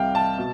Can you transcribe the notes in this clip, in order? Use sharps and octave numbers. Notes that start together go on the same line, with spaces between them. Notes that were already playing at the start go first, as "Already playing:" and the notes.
Already playing: C2 C3 G3 F5 G5
A5
B2